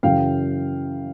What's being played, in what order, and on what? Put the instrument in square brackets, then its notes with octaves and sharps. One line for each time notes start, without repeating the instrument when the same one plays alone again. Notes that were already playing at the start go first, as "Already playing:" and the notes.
[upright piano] F#2 C#3 E3 F5 G5